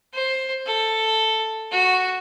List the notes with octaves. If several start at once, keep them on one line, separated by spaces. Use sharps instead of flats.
C5
A4
F#4